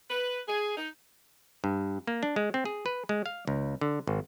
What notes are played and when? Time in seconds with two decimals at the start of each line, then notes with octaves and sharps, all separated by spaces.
0.10 B4
0.48 G#4
0.77 D#4
1.64 G2
2.07 A#3
2.23 D4
2.36 G#3
2.54 C4
2.65 G#4
2.86 B4
3.09 G#3
3.26 F5
3.48 C#2
3.81 D3
4.07 G#1